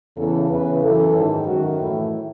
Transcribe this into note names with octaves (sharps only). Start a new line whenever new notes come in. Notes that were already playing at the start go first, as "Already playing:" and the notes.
E2 C#3 E3 A4
E2 C#3 E3 B4
F#2 E3 A4
G#2 D#3
F#2 D#3 F#4
A2 E3 E4